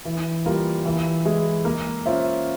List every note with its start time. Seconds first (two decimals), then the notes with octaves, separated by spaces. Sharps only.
0.05 E3
0.46 G3 A#3 F4 A#4
0.86 E3
1.25 G#3 E4 G#4
1.65 A#3
2.06 C#4 F4 C5 E5